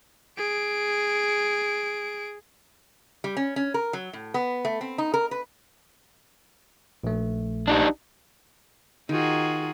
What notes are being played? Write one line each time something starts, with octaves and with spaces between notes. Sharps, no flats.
G#4 D7
G3
C#4
C#4
A#4
F#3
A2
B3
A3
C4
D#4
A#4
B4
A#1 A3
D4 D#4 G4
D#3 F4 F#4 G#4